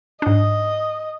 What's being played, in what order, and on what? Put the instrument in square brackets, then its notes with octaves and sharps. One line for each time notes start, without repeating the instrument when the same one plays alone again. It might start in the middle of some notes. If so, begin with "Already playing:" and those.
[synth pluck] G#2 D4 [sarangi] D#5